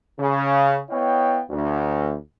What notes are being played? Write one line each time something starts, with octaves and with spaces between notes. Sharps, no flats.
C#3
B3 E4 C#5 D#5 F5 G5
D2